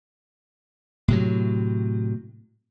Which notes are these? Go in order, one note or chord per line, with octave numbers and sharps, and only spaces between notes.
A2 C3 F#3